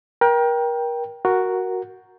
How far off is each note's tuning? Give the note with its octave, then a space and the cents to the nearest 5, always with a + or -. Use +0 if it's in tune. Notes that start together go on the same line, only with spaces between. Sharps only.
A#4 +30 G5 +0
F#4 +0 A#4 +0